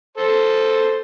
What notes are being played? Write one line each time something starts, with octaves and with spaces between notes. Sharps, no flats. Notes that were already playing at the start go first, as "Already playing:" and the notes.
A4 C5